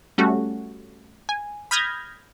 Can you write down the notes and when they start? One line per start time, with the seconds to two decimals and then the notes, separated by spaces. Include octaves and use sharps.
0.18 G3 A3 C#4 F#4
1.29 G#5
1.71 B5 D#6 F6 G6 G#6 A#6